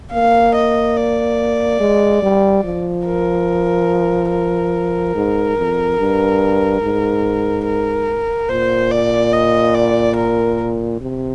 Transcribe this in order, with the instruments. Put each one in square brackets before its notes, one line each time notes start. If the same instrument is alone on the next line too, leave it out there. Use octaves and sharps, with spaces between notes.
[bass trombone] A#3 [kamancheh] F5
[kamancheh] D#5
D5
[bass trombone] G#3
G3
F3
[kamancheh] A#4
A#4
[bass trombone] G#2
F2
G2
G#2
[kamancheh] A#4
[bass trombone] A#2 [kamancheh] C5
[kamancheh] D5
D#5
D5
A#4
[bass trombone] C3